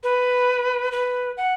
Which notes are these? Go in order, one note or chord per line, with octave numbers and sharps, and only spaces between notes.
B4
B4
F#5